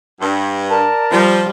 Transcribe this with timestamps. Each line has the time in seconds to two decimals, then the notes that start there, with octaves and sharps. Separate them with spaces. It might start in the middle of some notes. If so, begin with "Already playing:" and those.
0.21 G2
0.70 A#4 D5 A5
1.11 F3 G3